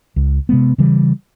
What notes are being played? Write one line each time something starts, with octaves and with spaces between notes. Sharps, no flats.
C#2
C3 G#3 B3
C#3 E3 G3